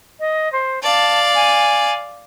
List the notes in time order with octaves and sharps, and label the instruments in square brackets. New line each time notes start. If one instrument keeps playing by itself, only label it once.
[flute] D#5
C5
[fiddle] D5 F5 [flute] A5
[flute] G#5